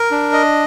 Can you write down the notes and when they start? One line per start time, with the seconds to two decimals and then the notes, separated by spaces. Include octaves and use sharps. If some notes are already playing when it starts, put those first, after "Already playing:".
Already playing: A#4
0.11 D4
0.33 D#5